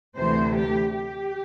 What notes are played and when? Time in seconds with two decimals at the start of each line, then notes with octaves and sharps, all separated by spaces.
0.17 D2 C3 E3 A3 C5
0.55 G4
0.94 G4